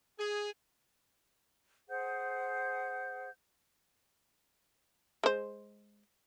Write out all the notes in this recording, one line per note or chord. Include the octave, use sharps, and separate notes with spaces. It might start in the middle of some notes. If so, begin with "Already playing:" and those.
G#4
G#4 C5 F#5 G6
G#3 C5